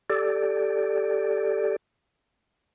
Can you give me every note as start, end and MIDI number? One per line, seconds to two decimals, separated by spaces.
0.10 1.76 67
0.10 1.76 69
0.10 1.76 74